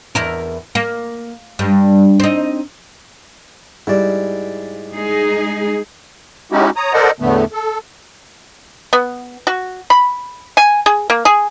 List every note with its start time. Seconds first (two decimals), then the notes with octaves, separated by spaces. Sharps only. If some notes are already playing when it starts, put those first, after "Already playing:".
0.15 E2 E4 A#4
0.75 A#3
1.59 G2
2.20 C4 D#4
3.87 G#2 G3 E4 D5
4.92 G#3 D#4 G#4
6.52 G#3 C#4 D#4 E4 F#4 G4
6.76 C#5 A#5 D#6
6.93 A4 A#4 C5 D5 D#5 F#5
7.20 E2 A2 D3 A3 B3
7.53 A4
8.93 B3
9.47 F#4
9.90 B5
10.57 G#5
10.86 G#4
11.10 A#3
11.25 G#4